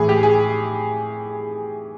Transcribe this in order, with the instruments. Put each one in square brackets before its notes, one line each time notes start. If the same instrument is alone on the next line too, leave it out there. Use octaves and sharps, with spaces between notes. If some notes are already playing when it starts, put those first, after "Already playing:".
Already playing: [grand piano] A2 E3 G#4
G4
G#4